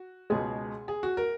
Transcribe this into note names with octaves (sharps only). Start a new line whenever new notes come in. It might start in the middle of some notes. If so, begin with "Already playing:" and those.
Already playing: F#4
C#2 B2 G#3 G#4
G#4
F#4
A#4